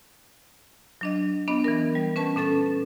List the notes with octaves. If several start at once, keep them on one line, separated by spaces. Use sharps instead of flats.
F#3 D4 D#5
B3 D4 D#5
E3 A#4
G3
C#4 B4 A5 C#6
A#2 C#4 A4 A6